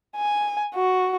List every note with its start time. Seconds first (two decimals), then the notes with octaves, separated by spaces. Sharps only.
0.16 G#5
0.75 F#4